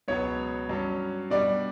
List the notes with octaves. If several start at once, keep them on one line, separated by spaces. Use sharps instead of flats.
C#2 B2 F#3 B3 C#5
G2 F#3 C#4
B2 G3 D4 D5